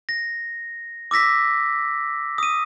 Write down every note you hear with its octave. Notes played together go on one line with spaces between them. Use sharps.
A#6
D6 E6 A#6 B6
D#6 D#7